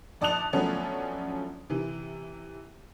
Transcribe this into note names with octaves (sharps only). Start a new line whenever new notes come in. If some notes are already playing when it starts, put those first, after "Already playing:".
A#1 D5 A5 D#6 F#6 F7
F3 F#3 A3 B3 C#4 D4
C3 E3